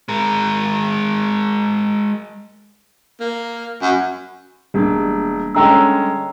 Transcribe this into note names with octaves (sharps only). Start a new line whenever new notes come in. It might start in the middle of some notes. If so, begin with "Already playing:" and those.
G#3 A#4
A#3
F#2
E1 G3 A#3 D4
D3 G#3 C#4 G5 A#5 E6